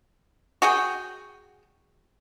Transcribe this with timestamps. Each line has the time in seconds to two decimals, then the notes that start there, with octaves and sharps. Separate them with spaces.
0.62 F#4 G#4 G5